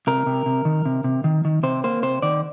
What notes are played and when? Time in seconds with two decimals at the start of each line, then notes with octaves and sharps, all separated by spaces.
0.07 C3 A#4
0.26 C3
0.46 C3
0.65 D#3
0.85 C3
1.04 C3
1.24 D#3
1.45 D#3
1.63 C3 C5
1.84 A#3 C5
2.03 C3 C5
2.22 D#3 D5